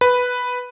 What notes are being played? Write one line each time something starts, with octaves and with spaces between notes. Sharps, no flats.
B4